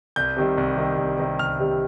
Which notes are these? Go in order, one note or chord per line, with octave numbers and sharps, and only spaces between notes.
C2 G6
C3 D#3 G3
C2
C3 D#3 G3
C2
C3 D#3 G3
C2 F6
C3 D#3 G3